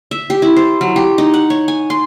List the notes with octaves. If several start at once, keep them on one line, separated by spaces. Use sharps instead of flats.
E5
G4
E4
C5
F#3
G4
D#4
F#5
C#5
G#5
C6